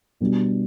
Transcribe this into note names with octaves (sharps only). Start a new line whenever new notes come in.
B2 G3 B3 D4